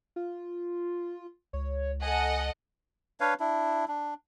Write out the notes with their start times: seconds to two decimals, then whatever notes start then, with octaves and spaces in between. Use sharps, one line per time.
0.16 F4
1.53 C#2 C#5
2.02 A4 D#5 F#5 G#5
3.20 D4 B4 C#5 F5
3.40 D4 E4
3.88 D4